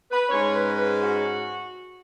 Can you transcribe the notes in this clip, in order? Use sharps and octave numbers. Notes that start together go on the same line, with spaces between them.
B4
G#2 G#3 C#4 C#5
B4
B4
F#4